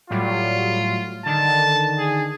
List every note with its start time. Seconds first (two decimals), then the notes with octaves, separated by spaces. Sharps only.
0.10 A2 F#3 G3 F4
1.26 D3 D#3 A5
1.98 G#4